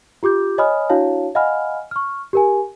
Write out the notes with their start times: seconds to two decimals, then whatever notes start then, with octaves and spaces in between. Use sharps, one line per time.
0.23 F4 G4 D6 G6
0.58 C#5 D#5 G#5 B5 D#6 F6
0.89 D4 E4 F#4 C#5 F5 A5
1.35 D#5 F5 F#5 G#5 B5 F6
1.91 C#6 F6
2.33 G4 A#4 G#5